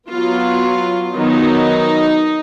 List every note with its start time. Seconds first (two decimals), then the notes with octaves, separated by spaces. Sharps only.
0.11 F#3 B3 F4
1.16 D#3 F#3 B3 D#4